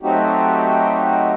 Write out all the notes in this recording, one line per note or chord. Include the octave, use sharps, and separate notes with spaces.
F#3 A3 C4 D#4 F#4 G4